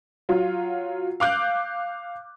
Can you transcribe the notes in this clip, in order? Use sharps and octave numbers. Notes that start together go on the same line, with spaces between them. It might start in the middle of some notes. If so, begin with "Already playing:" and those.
F#3 F4
F5 D6 F#6 G6